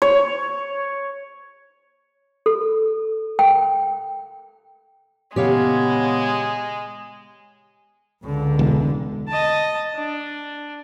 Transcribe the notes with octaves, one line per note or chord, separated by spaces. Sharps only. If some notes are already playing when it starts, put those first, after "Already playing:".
C#5
A4
G5
A#2 C#3 E3 G#3 B3 G4 C#5 F5
C#2 D3
E1
D#5 A5
D4